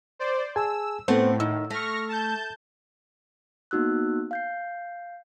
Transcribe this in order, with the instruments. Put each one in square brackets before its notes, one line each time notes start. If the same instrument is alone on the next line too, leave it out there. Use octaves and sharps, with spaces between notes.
[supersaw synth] C5 D5
[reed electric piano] G#4 G#5 A5 [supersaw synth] E6
[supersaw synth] A2 [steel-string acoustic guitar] A3 C4 F#5 [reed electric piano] B3 C5
[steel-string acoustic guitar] D#3 [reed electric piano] E6
[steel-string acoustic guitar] A3 [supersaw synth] C#6 F6 A#6
[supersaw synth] A5 G6
[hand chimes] A#3 B3 D#4 F#4 E6 F#6
F5 G6 C7